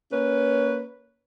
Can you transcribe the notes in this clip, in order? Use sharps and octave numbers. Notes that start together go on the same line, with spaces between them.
A#3 C#4 B4 C#5